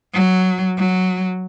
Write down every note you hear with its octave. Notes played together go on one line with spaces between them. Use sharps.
F#3
F#3